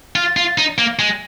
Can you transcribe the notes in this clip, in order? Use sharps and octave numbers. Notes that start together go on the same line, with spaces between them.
F4
F4
D#4
A#3
G#3